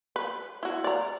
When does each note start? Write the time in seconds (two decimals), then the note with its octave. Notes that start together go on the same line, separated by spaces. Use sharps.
0.16 B4
0.63 E4 F#4
0.84 D5 A#5